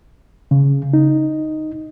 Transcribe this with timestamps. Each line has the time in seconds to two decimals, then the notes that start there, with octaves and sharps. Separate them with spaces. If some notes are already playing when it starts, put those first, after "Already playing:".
0.51 C#3
0.93 D#4